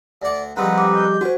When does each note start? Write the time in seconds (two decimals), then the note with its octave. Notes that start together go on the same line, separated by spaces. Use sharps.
0.22 D2 D5 F#5
0.56 F2 G3 G#3 C4 D#4 B4 F#5
0.78 D6
0.95 G6
1.21 C#4 F#4 C5